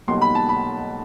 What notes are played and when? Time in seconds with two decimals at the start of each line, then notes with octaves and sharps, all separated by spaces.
0.08 B1 B2 G3 A#3 D#4 C6
0.21 B5
0.35 A5
0.49 B5